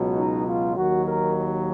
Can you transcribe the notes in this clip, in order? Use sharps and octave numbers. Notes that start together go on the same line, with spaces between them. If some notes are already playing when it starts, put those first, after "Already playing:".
Already playing: C#2 B2 F#3
D#4
F4
D#2 D#3 F#3 F#4
A#4